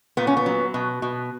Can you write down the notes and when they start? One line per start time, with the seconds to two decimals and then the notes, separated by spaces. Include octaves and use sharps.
0.17 A#2 B3
0.27 C#4
0.37 B3
0.46 F#3
0.74 B2
1.02 B2